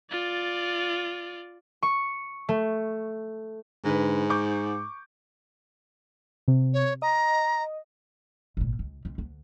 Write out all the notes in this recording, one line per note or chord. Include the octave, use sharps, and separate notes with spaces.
F4 D5
C#6
A3
G#2 D3 B4
C#6 D6 G6
C3
C#5
D#5 A#5
G#1 A#2
C#2
C#2 C#3
D2